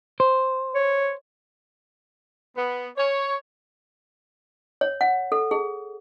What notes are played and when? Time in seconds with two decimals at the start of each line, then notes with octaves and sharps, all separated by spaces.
0.20 C5
0.75 C#5
2.56 B3
2.97 C#5
4.81 C#5
5.01 F#5
5.32 A4
5.51 G#4